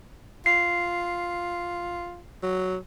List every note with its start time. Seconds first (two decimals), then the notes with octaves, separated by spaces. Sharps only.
0.46 F4 C7
2.43 F#3